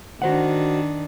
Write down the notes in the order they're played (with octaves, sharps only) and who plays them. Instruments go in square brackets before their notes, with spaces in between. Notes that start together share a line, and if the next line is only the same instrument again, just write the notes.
[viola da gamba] D#3 D4 [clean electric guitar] F#4 C5 F#5